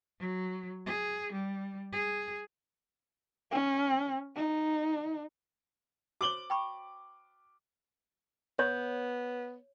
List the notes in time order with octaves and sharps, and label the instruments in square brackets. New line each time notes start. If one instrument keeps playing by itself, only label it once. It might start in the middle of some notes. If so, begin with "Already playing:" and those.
[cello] F#3
G#4
G3
G#4
[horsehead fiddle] C#4
D#4
[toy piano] F#4 C5 C#5 [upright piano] D6 F#7 G7
[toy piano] G5 B5 C#6
[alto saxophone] B3 [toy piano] C#5